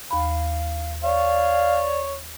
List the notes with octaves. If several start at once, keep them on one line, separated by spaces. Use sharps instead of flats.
D#2 F5 B5
C#5 D5 F5